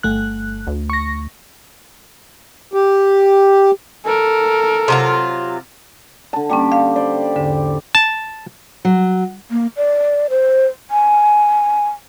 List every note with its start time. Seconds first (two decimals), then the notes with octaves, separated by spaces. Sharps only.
0.03 G1 A3 F#6
0.67 D2
0.90 C#6 A#6
2.73 G4
4.05 A4 A#4
4.88 C3 F#3 F4
6.33 D3 A5
6.50 G3 A#3 C#4 G4
6.72 F5
6.96 C5 D5
7.36 E2 G#2 D3
7.95 A5
8.85 F#3
9.51 A#3
9.77 D5
10.30 C5
10.91 G#5